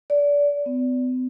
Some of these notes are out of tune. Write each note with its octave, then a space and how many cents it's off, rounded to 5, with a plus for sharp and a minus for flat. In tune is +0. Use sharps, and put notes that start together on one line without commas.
D5 -25
B3 +45